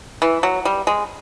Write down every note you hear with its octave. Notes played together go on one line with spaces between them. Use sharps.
E3
F#3
G3
G#3